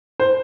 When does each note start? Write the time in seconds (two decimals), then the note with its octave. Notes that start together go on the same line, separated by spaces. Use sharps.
0.20 C5